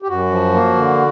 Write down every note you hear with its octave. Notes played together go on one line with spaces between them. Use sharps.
G4
F#2 F#4
F3
A#3
D3